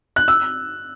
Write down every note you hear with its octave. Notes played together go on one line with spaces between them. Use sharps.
F#6
E6